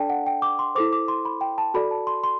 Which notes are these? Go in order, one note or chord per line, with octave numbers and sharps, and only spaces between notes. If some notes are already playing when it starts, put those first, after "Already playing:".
Already playing: D4 A4 D5 G5 A5
F#5
G5
D6
C6
E4 A4 C5 D6
D6
C6
B5
G5
A5
F#4 A4 D5 B5
A5
C6
C6